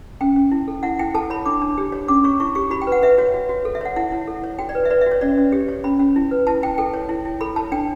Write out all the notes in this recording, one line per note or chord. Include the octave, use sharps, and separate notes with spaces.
C#4 G5
C#4
E4
A4
E4 F#5
E4 G5
A4 A5
C#5 B5
D4 D6
D4
G4
C#5
C#4 D6
C#5 C#6
E4 C#6
G4 C#6
F#4 B5
G5
B4
F#5
B4 E5
F#4 C#5
F#4
F#4
A4
E5
C#5 F#5
E4 F#5
E4
A4
C#5
F#4 G5
D5
B4
E5
B4 D5
E5
F#4
C#5
C#4 D5
C#4
G4
C#5
C#4 B5
C#4
E4
B4
E4 A5
E4 G5
A4 G5
C#5
E4
E4
A4 B5
C#5 A5
D4 G5